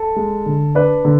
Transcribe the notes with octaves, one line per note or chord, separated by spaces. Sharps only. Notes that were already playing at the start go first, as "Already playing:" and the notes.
Already playing: A4
G#3
D3
D4 B4 D5
D3